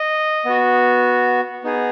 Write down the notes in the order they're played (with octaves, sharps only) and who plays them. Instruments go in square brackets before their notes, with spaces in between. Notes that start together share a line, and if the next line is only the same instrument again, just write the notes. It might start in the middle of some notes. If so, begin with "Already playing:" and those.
Already playing: [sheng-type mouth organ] D#5
B3 F#4
B3 D#4 G#4